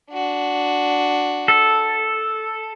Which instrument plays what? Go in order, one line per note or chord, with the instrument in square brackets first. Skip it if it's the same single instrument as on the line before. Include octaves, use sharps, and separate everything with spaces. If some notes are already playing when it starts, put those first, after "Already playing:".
[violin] D4 F#4
[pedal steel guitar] A4